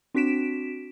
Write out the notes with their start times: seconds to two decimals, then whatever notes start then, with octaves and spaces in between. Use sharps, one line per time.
0.14 C4 D4 F#4 B6 D7 E7